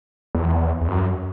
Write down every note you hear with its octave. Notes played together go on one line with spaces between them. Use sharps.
E2
E2
F#2